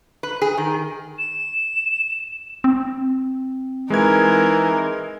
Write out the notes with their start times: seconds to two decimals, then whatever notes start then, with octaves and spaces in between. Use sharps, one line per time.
0.23 B4
0.42 G#4
0.57 D#3
1.19 E7
2.64 C4
3.90 E3 G#3 D#4 A#4 G#6